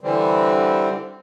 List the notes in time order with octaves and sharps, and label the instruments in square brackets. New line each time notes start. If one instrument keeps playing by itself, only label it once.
[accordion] D3 E3 G3 C4